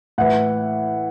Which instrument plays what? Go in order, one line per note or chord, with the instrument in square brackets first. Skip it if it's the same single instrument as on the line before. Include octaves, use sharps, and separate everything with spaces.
[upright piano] A2 E3 F#5